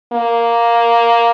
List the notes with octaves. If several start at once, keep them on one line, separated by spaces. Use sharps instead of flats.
A#3